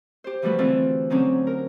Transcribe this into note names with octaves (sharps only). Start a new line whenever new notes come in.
G4 C5
E3 F3 G3 A3 F#4 B4
D3 E3 A3 C4 F4 A4
D3 F#3 C4 C#4 D#4
A#4